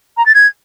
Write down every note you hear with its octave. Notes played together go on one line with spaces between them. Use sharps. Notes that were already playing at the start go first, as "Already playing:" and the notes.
A#5
A6
G#6